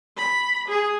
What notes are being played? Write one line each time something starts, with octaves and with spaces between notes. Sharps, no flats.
B5
G#4